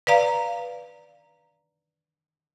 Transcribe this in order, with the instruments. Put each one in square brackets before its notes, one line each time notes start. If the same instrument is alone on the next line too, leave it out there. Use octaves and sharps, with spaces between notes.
[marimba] B4 D5 F5 A#5